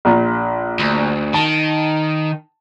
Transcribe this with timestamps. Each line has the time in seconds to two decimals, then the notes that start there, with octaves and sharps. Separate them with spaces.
0.05 A#1 A#2
0.79 D2
1.34 D#3 A5